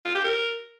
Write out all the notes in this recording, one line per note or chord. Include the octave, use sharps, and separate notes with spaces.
F4
G4
A#4